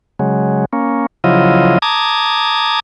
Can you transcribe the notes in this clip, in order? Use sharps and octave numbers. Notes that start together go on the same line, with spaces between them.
C#3 F#3 G#3
A#3 C#4
C#3 F3 F#3 E4 F4 D#5
A5 A#5 D6 D#6 G#6